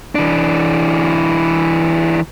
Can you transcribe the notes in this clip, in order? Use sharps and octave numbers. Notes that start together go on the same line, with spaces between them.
E3 D4